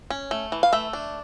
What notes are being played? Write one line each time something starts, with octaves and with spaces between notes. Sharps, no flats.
C#4
A3
E3
F5
A3 E5
D4